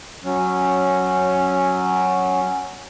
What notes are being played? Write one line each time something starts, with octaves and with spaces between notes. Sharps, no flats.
F#3 C#4